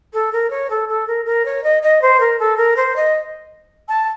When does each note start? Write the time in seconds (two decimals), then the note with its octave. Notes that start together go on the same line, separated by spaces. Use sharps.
0.13 A4
0.32 A#4
0.50 C#5
0.70 A4
0.88 A4
1.07 A#4
1.25 A#4
1.45 C#5
1.63 D#5
1.82 D#5
2.01 C5
2.20 A#4
2.39 A4
2.57 A#4
2.76 C5
2.95 D#5
3.88 A5